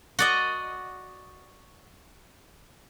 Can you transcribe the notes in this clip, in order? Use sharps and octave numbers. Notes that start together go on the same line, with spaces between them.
F#4 D5 D#5